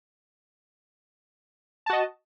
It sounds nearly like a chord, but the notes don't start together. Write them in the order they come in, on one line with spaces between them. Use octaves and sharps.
A5 F#4 D#5